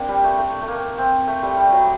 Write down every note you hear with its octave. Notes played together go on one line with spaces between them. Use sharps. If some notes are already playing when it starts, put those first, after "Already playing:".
Already playing: A#3 C4 D4
G3
A3
A3
A3
A#3
C4
A3
G3
G3
F#3